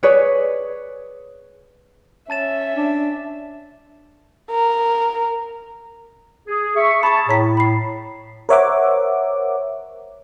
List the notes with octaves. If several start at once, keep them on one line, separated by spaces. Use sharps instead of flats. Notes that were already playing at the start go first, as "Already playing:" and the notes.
G#4 B4 C#5 D5
C#4 E5 A5 A6 E7
D4
A#4
G#4
E5 C#6
G#4 A5 B5 C#6
A2 C#5 A#5 B6
B5 C7
A#4 C5 C#5 E5 F#5 D6